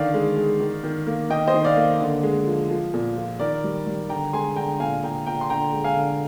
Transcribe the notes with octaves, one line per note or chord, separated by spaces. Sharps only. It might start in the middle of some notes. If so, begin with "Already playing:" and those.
Already playing: D3 D#3 D5 F5
G#3
G#3
D#3
D#3
A#3
D#3 D#5 G5
C5 D#5
D#3
D5 F5
A#3
D3
G#3
F3
F3
A#2
F3
D#3 A#4 D5
G3
G3
D3 G5 A#5
G#3 G#5 C6
D3 G5 A#5
A#2 F5 G#5
A#2 G5 A#5
A#2 G5 A#5
C6
D3 G5 A#5
G#3
F5 G#5
D3